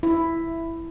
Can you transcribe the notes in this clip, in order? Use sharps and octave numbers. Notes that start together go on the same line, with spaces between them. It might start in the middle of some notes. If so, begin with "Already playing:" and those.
E4